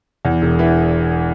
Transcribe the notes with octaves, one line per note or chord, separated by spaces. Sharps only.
E2
E1
E3